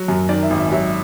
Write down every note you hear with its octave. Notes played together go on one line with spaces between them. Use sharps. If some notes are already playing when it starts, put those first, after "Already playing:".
Already playing: F#3
F#2
D#3 D5
E5
G#1
E5
F#3 E5